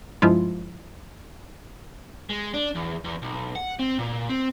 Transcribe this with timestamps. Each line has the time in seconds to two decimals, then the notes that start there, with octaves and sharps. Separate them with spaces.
0.22 G2 F3 G#3 E4 F4
2.29 G#3
2.54 D4
2.75 E2
3.04 E2
3.22 B1
3.56 F#5
3.80 C4
3.99 A#2
4.29 C4